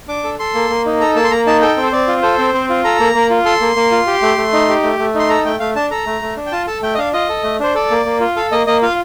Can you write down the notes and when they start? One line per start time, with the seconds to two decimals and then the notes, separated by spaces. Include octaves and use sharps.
0.08 D4 D6
0.24 A4
0.39 A4 C6
0.55 A#3
0.70 A#3
0.86 D#4
1.00 A4 A#5
1.15 A#3 A5
1.24 C6
1.31 A#3 A#5
1.47 D#4 A5
1.62 A4 G5
1.77 C4
1.83 C5
1.92 C4 D5
2.08 F4
2.23 A4 C5
2.38 C4
2.54 C4
2.70 F4
2.84 A4 A#5
3.00 A#3
3.15 A#3
3.30 F4
3.45 A4 C6
3.61 A#3
3.76 A#3
3.91 F4
4.07 G4
4.22 A3
4.37 A3
4.53 D#4
4.69 G4
4.84 A3
4.99 A3
5.15 D#4 C6
5.29 A4 A#5
5.45 A3 G5
5.60 A3 F5
5.75 D4 A5
5.91 A4 A#5
6.07 A3
6.22 A3
6.37 D4
6.46 G5
6.52 F4 A5
6.67 A4 A5
6.82 A3 G5
6.94 D#5
6.98 D4 F5
7.13 F4 D#5
7.29 A4
7.43 A3
7.60 D4 C5
7.75 A4 D5
7.91 A#3
8.06 A#3
8.20 F4
8.36 A4 F5
8.52 A#3 D#5
8.67 A#3 D#5
8.82 F4 F5